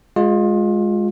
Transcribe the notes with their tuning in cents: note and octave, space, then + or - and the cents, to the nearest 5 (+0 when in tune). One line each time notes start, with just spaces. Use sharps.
G#3 +0 F4 +25